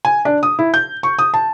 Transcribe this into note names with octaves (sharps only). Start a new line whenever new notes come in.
G#5
D4
D#6
E4
G6
C#6
D#6
A5